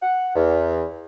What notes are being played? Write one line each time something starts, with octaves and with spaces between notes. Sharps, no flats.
F#5
E2